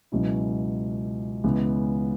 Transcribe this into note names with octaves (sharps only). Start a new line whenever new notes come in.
C#2 B2 F#3 C#4 E4
C#2 C#3 E3 B3